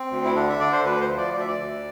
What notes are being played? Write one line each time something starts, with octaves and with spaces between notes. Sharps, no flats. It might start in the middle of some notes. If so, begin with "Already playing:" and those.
Already playing: C4
D2
E4
D3 D4
E5
D3 D5
C5
D2 B4
C5
F3
D5
D2 D5
E5
D5
D2